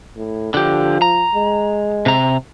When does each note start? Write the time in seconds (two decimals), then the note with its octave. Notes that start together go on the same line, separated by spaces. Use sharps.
0.17 A2
0.54 D3 F3 G4
1.02 A#5
1.34 G#3
2.06 C3 A#5